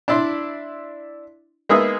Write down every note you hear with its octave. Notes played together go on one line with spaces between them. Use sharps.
D4 E4 D5 C6
G#3 A#3 B3 D#4 G#4 E5